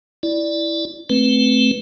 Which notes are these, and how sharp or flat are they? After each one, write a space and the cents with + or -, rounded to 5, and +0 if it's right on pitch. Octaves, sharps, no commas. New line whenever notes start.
E4 +0 D5 +5
A3 +0 C4 +0 B4 +0